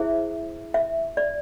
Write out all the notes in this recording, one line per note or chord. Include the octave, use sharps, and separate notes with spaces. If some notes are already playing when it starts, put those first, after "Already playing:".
Already playing: E4 G#4 C5 E5
E5
D5